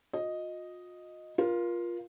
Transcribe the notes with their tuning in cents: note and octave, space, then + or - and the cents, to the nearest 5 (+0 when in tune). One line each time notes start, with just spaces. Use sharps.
F4 +45 D#5 +0
F4 +0 A#4 +30